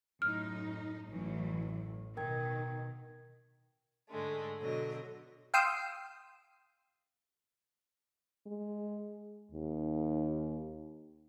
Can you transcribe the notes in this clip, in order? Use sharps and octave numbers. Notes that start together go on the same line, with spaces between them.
F#2 A2 D#4 F6
A1 F#2 A2 E3 F#3
B2 D#3 A#4 G5 G#6
G#2 D3 G#3 A3
B2 D3 F#3 D#5
F5 G5 C6 D#6 E6
G#3
D#2